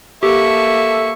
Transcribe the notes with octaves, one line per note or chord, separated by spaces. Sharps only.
A#3 G4 A4 E5 C#6